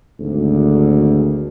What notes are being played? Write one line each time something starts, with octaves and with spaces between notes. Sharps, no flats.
G#1 D2